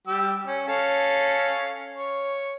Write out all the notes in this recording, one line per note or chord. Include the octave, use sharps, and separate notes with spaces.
G3 G4 E6
C#4
C#4 A4 F5
C#5